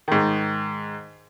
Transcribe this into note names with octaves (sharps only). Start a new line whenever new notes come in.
G#2 D#3